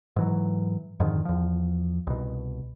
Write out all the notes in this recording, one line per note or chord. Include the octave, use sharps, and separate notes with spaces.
G#2 E3 F#3
F2 G#2 D3 D#3
E2 F3
C2 B2